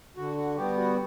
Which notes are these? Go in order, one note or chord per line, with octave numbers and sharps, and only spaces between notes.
D3 F#4
F#4
G3 B3 G4
F#4